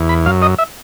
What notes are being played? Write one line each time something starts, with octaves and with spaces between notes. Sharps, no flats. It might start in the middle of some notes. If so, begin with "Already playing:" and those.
Already playing: E2
B5
F#2 F5
D#5
E5